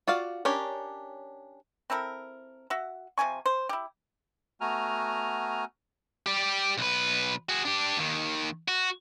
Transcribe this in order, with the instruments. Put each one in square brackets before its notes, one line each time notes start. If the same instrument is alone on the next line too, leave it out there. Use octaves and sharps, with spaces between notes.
[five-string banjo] F4 F#4 D5 F5
C#4 D4 G4 A#4 C#5
[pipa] C4 E4 A4 A#4
F#4 E5
C3 F3 G#5 C#6
C5
E4 G4
[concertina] A3 B3 F#4 G#5 A#5 F6
[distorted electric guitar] G4 D5
B1 B4
F#4 G#4
D4 G4
D#2 D#3
F#4